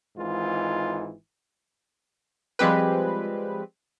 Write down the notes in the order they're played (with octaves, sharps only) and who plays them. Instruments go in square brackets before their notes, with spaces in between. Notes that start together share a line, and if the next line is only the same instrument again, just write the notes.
[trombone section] G#1 G#2 E3 F4
[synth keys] F3 G3 G#3 C4 G4 B4